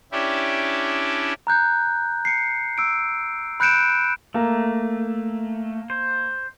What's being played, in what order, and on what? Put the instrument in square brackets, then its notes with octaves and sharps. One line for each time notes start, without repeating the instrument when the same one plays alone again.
[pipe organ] C#4 D4 E4 G4
[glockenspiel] A#5 F#6 G6
C7 C#7
E6 D7
B5 F#6 G6 C#7 D7 E7
[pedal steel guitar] A3 [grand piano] A#3 A#5
[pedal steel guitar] C5